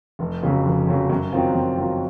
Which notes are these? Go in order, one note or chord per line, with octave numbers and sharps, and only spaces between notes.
F1
F2 C#3 F#3
F1
F2 C#3 F#3
F#2
D#3 F#3 C4 F4
F#2
D#3 F#3 C4 F4